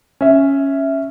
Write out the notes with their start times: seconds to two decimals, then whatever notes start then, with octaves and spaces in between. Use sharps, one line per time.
0.21 C#4 E5